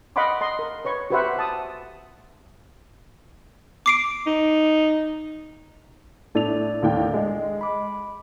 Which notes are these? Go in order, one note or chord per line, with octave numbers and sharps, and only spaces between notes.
D#5 F5 F#5 B5 C6 D6
D#5 C6
A#4
B4 C#5 C#6
F#4 G4 B4 C5 E5 F#5
E5 A5 D#6
D6 C7 D7
D#4
A2 D4 A4 D5 F7
D#2 A2 G5
G#3
B5 D6